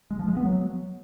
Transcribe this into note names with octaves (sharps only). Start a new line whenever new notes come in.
G#3
F3
G#3
B3
F#3